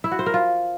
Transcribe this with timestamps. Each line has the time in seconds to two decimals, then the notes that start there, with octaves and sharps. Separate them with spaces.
0.04 E4
0.11 F#4
0.19 C5
0.26 A#4
0.34 F4